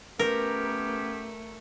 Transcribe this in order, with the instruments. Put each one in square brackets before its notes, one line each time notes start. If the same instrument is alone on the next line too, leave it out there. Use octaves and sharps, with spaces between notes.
[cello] A3 [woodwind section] B3 C#4 G4 [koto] A#4